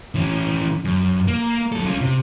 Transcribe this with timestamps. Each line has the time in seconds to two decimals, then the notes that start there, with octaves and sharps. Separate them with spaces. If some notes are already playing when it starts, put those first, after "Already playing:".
0.15 E3 C#4
0.85 F#2
1.28 A#3
1.72 F#3 A4
1.86 C#4 F4
2.01 C3